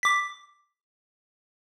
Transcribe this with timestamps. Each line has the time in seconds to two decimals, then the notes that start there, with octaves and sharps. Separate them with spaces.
0.03 D6 B6